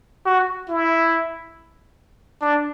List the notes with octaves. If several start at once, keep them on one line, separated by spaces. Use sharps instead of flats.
F#4
E4
D4